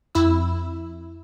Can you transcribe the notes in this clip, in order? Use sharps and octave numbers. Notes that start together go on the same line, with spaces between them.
F2 E4 E6